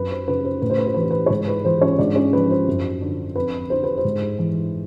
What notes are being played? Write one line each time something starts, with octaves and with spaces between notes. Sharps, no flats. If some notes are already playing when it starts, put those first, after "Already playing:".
Already playing: F#2 B4
C5
C#3 B4
C5
A2 B4
C5
B4
C5
E3 B4
C5
B4
C#5
G#2 C5
B4
E3 C5
C#4 C#5
G#2 D4 D5
C#4 C#5
F3 B4
C5
F#2
D3
F2 B4
D3 C5
B4
C5
G#2
E3